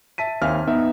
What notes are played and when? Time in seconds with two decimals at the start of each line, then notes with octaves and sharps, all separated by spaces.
0.18 E5 A5 B6 D#7
0.42 D#2 C4 E5 F5 G#5 F6
0.67 B3 D#4 E5